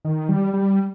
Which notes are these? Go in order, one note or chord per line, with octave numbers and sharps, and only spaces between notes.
D#3
G3
G3